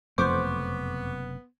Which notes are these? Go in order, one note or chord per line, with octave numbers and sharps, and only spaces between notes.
F#1 F2 C3 A3 B3 C5 C#6 D6